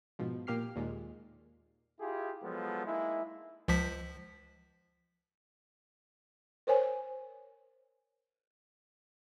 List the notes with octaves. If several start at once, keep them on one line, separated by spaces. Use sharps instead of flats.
G#2 B2 F3
A#2 A#3 G4 F6 C7
D#2 A#2 G#3
E4 F4 G4 G#4
F3 F#3 G#3 B3 A4
G#3 A#3 D#4 E4
C#2 F3 B6
A#4 C5 C#5 G#5